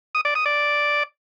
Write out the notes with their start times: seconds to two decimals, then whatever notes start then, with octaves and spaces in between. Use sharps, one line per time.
0.15 D#6
0.25 D5
0.35 D#6
0.46 D5